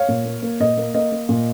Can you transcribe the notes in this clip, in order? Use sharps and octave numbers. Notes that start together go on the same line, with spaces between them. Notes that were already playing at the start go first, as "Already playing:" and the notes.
Already playing: C#5 F5
A#2
A#3
A#3
A#2 D#5
A#3
A#3 D#5
A#3
A#2